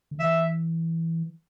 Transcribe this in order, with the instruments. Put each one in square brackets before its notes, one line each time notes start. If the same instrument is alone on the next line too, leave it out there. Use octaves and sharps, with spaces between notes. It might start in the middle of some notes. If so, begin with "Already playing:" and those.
[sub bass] D3
[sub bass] E3 [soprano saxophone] E5